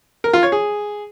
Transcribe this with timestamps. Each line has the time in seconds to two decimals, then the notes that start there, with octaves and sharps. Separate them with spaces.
0.24 A#4
0.33 F4
0.43 C#5
0.52 G#4